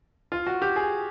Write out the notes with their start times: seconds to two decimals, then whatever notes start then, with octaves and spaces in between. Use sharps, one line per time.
0.32 F4
0.47 F#4
0.62 G4
0.76 G#4